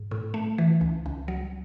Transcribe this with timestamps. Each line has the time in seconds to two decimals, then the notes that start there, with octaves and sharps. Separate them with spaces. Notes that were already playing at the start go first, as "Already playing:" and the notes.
Already playing: G#2
0.11 A2
0.34 A3
0.58 E3
0.81 C#2
1.06 C#2
1.28 F#3